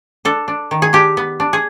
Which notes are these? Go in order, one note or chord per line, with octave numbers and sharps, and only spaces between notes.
D4 A4
D4
D#3
G#4
D4 G4
B3
D4
G#4